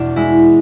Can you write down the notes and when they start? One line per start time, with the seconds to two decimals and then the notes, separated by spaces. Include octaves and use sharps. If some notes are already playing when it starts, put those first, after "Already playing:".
Already playing: E2 B2 D4
0.16 G#3 E4